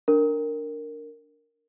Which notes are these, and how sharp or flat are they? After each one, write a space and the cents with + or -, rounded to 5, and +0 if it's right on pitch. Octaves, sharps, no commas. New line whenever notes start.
D4 +0 A#4 -10